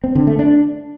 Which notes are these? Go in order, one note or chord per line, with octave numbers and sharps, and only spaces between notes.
C4
D3
A3
D4